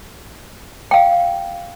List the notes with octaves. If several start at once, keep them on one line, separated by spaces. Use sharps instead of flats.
F5 G5